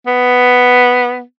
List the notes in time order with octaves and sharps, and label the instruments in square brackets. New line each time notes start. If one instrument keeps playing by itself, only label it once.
[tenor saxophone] B3